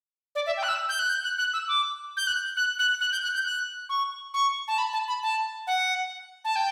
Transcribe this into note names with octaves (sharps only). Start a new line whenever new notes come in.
D5
E5
G5
F#6
E6
G6
F#6
G6
F#6
F#6
E6
D6
G6
F#6
F#6
F#6
F#6
G6
F#6
G6
F#6
C#6
C#6
A5
B5
A5
B5
A5
F#5
A5
G5